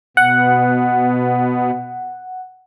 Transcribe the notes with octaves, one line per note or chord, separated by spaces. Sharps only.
B2 B3 F#5